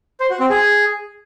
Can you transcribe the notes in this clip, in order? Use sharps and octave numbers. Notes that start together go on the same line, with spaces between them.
C5
F#4
C4
G#4